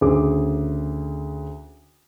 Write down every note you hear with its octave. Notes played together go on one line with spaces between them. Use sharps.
D2 C#3 G#4 D6